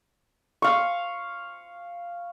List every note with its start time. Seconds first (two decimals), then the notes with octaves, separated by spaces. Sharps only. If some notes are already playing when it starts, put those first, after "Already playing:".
0.62 F5 C#6